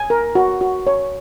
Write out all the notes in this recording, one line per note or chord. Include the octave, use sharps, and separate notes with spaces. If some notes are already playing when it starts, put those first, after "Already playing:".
Already playing: G#5
A#4
F#4
F#4
C#5